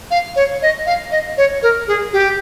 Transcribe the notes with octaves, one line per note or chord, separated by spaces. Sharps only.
F5
C#5
D#5
F5
D#5
C#5
A#4
G#4
G4